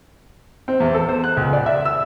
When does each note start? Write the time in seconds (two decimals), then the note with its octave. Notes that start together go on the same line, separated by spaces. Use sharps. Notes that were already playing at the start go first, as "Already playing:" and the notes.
0.68 C4
0.80 E2
0.94 A4
1.09 C5
1.24 F#6
1.37 C#2
1.53 D5
1.66 E5
1.85 E6